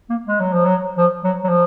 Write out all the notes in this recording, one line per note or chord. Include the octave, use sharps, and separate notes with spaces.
A#3
G#3
F#3
F3
F#3
F3
F#3
F#3
F3